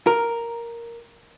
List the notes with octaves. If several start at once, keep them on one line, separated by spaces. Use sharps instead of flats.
A#4